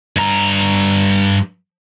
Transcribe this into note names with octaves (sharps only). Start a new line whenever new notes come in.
G2 A#5